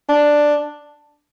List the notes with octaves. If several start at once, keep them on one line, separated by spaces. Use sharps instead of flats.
D4